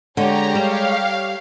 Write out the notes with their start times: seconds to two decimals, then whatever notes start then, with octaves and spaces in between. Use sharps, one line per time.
0.17 D3 G#3 G4 C#5 A#5
0.55 G3 F5